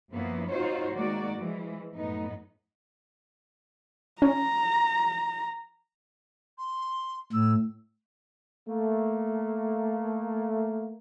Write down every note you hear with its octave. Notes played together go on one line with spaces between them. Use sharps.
F#2 F3 A#3 B3 C#4 E4
C4 D#4 F4 F#4 C5 C#5
D#3 G#3 A#3 F#4 D5
E3 F3 G#3
F#2 A2 B3 D#4
C#4 A#5
C6
A2 E6
A3 A#3